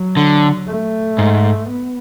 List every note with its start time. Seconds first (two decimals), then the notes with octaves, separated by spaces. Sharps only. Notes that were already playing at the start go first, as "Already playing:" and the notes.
Already playing: F#3
0.17 D3
0.67 A3
1.18 G#2
1.69 B3